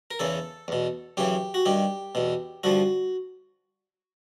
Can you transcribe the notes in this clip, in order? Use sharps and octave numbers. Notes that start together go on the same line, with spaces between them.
A#4
E2 C#3 E3 A4
E2 B2
F#2 C#3 E3 G4
F#4
G2 D#3 G4
E2 B2
G2 D3 F3 F#4